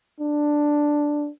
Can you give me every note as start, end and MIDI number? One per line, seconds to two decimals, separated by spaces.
0.20 1.29 62